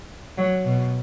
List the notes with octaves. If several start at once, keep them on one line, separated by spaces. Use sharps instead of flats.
F#3
B2